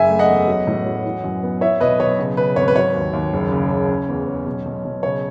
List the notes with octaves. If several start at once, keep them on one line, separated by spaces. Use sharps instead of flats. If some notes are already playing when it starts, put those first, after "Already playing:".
Already playing: F#1 E5 G#5
A3
D#5 F#5
E2
F#3
A2
F#3
E3
F#2
B3
E4 C#5 E5
B1 B4 D#5
B1 C#5
C#3
C#3 B4
G#1 C#5
B4
F#3 C#5
D#2
D#2
F#1
C#3
C#3
C#4
E2
C#4
B1
B1
B1
C#3 C#5